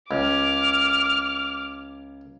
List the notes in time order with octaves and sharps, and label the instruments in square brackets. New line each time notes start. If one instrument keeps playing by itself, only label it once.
[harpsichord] C#2 [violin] D6 F6